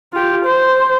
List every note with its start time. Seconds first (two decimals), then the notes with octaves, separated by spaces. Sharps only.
0.13 F4 G4
0.45 C5